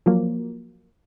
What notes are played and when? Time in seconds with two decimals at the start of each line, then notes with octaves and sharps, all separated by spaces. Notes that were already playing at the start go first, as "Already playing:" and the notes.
0.06 F3 F#3 A#3